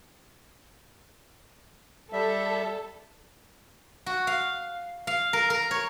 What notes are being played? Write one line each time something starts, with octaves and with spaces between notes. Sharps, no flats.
G3 A4 E5
F#4
F5
F5
A#4
A#4
C#5